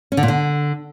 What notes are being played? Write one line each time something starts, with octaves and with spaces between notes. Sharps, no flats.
C#4
D3
A#2
D3